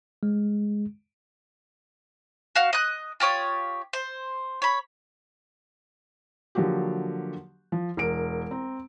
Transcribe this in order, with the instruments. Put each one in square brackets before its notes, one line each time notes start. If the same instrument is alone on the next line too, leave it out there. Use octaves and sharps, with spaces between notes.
[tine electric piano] G#3
[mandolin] F#4 F5
D#5 F#6
F4 G4 C#5 D#6
C5
C#5 B5
[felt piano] D3 F3 F#3 A#3 F#4 G4
F3
E1 A#4 D7
C4 A#5